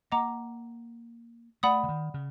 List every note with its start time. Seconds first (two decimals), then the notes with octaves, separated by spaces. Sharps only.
0.12 A#3 D#5 F#5 A#5 D6
1.63 A3 D5 F#5 B5 D#6
1.83 D3
1.89 D#3
2.14 C#3